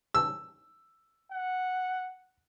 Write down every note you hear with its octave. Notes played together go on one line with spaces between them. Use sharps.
E6
F#5